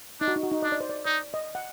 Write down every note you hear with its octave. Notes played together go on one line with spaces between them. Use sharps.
D4 D#4
F#4
D#4
F#4
D#4
D4 D#5
D5
C5
D5
D#4 D5
D#5
F#5